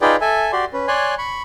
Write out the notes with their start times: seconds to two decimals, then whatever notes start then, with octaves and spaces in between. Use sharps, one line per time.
0.02 D#4 F4 G#4 B4 D5 G5
0.21 A4 E5 G#5
0.52 F#4 G4 D5 C6
0.73 C#4 B4
0.88 C#5 D5 G#5 C6 F#6
1.18 B5 C#6